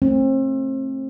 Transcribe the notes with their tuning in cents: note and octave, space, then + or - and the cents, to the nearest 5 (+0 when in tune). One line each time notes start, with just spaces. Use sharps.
A3 +10 C4 +35